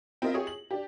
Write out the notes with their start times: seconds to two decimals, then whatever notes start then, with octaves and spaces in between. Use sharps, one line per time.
0.22 C4 E4 F4 A#4 D#5 E5
0.34 G4 G#4 C#5 D#6
0.47 F#7
0.71 D4 G4